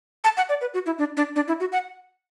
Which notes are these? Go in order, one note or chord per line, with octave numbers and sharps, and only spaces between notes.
A5
F#5
D5
B4
F#4
E4
D4
D4
D4
E4
F#4
F#5